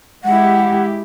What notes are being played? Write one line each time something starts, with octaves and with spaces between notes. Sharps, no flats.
G#3 E4 G4 F#5